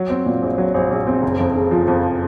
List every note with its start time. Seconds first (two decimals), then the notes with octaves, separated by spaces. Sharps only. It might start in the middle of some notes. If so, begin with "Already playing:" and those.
Already playing: F#3
0.10 C4
0.26 A#2
0.42 A#1
0.58 F#3
0.74 A#1
0.91 A#1
1.07 C4
1.22 F#1
1.39 F2
1.55 C#3
1.71 F3
1.88 F2